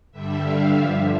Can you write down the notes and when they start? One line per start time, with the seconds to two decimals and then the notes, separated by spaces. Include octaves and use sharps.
0.12 G2 D3 G3 E5
0.43 F5
0.75 G2 D3 F3 E5